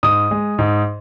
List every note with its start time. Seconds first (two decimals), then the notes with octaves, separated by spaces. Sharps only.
0.03 G#2 D#6
0.31 G#3
0.59 G#2